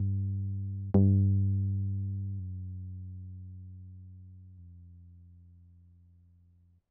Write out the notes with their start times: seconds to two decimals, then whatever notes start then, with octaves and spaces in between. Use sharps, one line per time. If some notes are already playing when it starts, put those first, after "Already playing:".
Already playing: G2
0.94 G2
2.39 F#2
4.58 F2